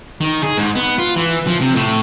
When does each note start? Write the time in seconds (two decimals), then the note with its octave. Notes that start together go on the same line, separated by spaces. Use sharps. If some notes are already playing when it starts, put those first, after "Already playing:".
0.21 D#3
0.43 G#4
0.57 G#2
0.75 B3
0.98 F4
1.16 E3
1.47 F3
1.61 C3
1.76 A2